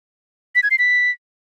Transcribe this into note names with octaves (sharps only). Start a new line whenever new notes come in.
B6
G#6
C7
B6